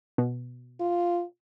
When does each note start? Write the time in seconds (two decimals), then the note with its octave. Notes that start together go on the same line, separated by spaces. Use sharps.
0.18 B2
0.80 F4